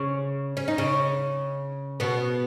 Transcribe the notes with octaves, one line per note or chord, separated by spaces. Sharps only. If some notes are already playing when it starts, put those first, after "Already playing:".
Already playing: C#3 C#4
C#4
D#4
C#3 C#4
B2 B3